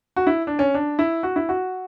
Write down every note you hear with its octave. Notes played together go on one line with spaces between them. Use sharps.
F#4
E4
D4
C#4
D4
E4
F#4
E4
F#4